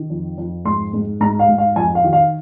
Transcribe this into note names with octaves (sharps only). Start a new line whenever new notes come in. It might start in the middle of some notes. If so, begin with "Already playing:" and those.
Already playing: D#3
F2
F2
G#2 C6
G#2
G#2 A#5
F5
G#2
F5
F2 G#5
F5
D#3
F5